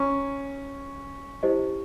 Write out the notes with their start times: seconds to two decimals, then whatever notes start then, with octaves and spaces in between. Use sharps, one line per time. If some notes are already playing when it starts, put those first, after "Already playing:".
Already playing: C#4 A#5
1.43 E4 G4 C5 D#5